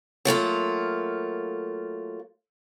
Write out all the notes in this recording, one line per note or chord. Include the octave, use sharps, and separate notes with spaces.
F#3 A3 A#3 F4